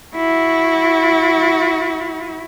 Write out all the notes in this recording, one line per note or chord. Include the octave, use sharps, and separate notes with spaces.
E4 F#4